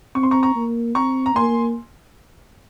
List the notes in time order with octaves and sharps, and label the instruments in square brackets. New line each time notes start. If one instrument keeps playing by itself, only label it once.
[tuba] C4 [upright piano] C#6
[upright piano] C6
A#5 C#6
A#5 C#6
[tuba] A#3
[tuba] C4 [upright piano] A#5 C#6
[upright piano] A#5
[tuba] A#3 [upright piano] G#5 C6